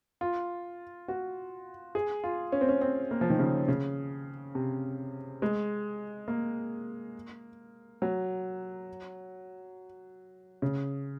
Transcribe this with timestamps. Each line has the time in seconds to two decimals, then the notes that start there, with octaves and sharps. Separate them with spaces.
0.21 F4
1.08 F#4
1.95 G#4
2.24 F4
2.52 C#4
2.61 C4
2.69 C#4
2.81 C4
3.11 A#3
3.21 F3
3.30 D#3
3.39 C#3
3.68 C#3
4.55 C3
5.42 G#3
6.28 A#3
8.02 F#3
10.62 C#3